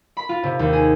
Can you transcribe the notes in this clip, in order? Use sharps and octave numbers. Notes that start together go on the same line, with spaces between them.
B5
F4
C3
D#2
G#4